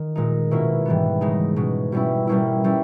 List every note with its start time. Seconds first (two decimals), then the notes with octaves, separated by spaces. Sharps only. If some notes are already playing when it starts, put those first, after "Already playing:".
Already playing: D#3
0.15 A#2 G#3 D#4
0.51 B2 A#3 C#4 E4
0.86 G#2 E3 G3 B3
1.21 C#3 G#3 D#4
1.56 B2 G#3 C#4
1.92 B2 G3 C#4 E4
2.27 B2 G3 A#3 C#4 E4
2.64 G3 C#4 E4